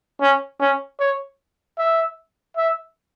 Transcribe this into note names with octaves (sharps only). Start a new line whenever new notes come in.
C#4
C#4
C#5
E5
E5